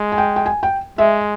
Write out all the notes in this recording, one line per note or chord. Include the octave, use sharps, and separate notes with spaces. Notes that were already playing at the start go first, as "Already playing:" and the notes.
Already playing: G#3
G#5
G5
G5
G#5
G5
G#3 E5